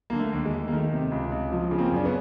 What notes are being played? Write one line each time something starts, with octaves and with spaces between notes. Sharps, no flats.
D3 A#3
A3
D#2
G#3
D#2
A#3
D#3 A3
C3
C#2
C#2
F3
C#3
A#3 C4
F#2
D4
B3 C#4